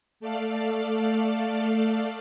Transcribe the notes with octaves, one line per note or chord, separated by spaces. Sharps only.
A3 A4 D5 F5